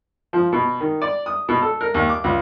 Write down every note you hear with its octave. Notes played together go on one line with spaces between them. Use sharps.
F3
B2
D#3
D5
D#6
B2
A4
A#4
D#2
D6
C#2